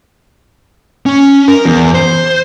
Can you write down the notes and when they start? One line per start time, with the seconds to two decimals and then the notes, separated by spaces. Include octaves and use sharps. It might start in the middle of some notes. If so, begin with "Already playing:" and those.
1.06 C#4
1.48 A#4
1.65 E2
1.95 C5